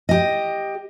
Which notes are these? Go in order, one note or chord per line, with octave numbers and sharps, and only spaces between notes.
G4 D#5